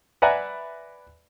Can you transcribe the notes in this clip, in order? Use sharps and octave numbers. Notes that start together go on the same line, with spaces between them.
B4 D5 E5 F#5 G#5 A#5